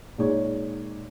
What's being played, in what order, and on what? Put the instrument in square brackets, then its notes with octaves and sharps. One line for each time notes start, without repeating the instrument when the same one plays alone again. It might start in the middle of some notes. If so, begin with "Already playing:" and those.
[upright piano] A#2 G#3 D#4 C#5